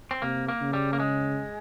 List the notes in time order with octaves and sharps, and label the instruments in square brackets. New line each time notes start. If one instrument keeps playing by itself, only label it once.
[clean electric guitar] C4
[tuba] C3 [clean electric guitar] A#3
[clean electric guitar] A#3
[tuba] C#3
[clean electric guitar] G3
A#3
G#3